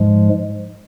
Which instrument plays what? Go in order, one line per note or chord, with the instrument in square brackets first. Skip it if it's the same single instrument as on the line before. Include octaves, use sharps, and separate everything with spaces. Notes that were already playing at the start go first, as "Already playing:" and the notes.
Already playing: [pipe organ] G#2 F3 G#3